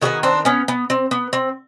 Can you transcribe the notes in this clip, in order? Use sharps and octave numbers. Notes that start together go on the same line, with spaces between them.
D#3 F#3 B3 F#4 G#4
C4 D4
B3 C#4
B3
C4
B3
C4